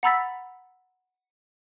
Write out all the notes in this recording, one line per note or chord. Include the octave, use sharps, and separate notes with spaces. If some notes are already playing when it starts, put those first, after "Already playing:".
F#5 A#5 B5 E6 A6 B6